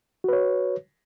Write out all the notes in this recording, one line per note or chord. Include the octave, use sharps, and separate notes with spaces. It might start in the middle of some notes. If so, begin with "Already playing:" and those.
F#4 B4 C#5